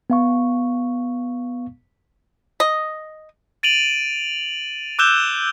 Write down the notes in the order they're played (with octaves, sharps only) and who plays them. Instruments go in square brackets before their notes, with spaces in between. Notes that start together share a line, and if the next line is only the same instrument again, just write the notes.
[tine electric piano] B3 F5 C#6
[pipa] D#5
[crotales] A6 D7 D#7 F7 F#7
D6 E6 F#6 G6 E7 G7